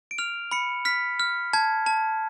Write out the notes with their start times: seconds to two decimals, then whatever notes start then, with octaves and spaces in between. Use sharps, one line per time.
0.11 D7
0.18 F6 F7
0.51 B5 C#7
0.85 F6 B6
1.20 F6
1.53 A5 G#6
1.86 A5